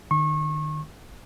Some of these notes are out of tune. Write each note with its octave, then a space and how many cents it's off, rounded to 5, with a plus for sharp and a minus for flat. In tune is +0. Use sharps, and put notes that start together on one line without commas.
D#3 -35 C#6 -30